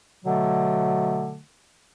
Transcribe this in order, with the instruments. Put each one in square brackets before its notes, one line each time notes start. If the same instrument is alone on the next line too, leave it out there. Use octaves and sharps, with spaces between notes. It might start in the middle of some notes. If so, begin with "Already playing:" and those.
[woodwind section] B2 D3 F#3 A3